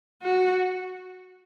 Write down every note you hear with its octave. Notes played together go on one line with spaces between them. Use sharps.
F#4